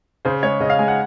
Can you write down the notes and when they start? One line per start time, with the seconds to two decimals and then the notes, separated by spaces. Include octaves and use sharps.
0.25 C#3 C5
0.43 G#3 C#5
0.60 C#3 D#5
0.70 F5
0.79 G#3 G#5
0.88 F#5